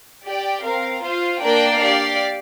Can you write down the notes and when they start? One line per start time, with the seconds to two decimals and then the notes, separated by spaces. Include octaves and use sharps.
0.24 G4 D5 G5
0.64 C4 A#4 F5
1.02 F4 C5 F5
1.42 A#3 D4 A#4 D5 G5
1.80 G4 D5 F5